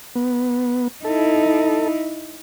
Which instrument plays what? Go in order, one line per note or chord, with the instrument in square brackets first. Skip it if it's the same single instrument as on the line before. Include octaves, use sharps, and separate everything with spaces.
[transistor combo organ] B3
[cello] D#4 E4 [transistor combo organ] A4